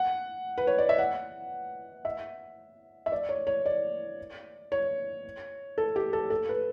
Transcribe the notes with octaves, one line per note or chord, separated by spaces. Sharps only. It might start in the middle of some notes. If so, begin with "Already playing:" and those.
Already playing: F#5
B4
C#5
D5
E5
F#5
E5
E5
D5
C#5
C#5
D5
C#5
A4
G4
A4
A4
B4